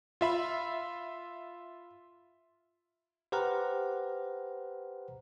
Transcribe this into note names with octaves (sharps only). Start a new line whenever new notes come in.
F4 E5 B5
G4 B4 C5 F#5 A#5 F6